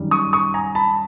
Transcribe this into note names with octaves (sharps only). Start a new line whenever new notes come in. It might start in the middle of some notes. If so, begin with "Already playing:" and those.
Already playing: F#2 D#3 G3
C#6 D#6
C#6 D#6
G#5 A#5
A5 B5